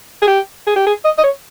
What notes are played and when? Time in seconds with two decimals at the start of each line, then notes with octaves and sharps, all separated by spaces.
0.22 G#4
0.27 G4
0.67 G#4
0.76 G4
0.87 G#4
1.04 D#5
1.18 D#5
1.24 C#5